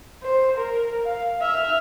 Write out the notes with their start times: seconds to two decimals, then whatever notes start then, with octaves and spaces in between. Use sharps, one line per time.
0.23 C5
0.57 A#4
1.05 F5
1.41 E5 F6